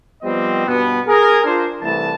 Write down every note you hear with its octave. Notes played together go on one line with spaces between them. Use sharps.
F3 G3 B3 C4 D#5
G2 B2 B3
G#4 A#4
D4 F4 A#4 C5
C2 E3 A3 A5